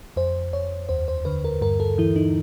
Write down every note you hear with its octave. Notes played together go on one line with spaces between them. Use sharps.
F2 C5
F2 C#5
D#2 C5
C5
D3 B4
A#4
G2 A#4
A4
E3 E4
D#4